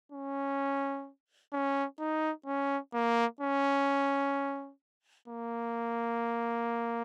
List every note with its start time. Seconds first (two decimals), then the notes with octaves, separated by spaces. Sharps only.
0.12 C#4
1.53 C#4
1.99 D#4
2.46 C#4
2.93 A#3
3.41 C#4
5.28 A#3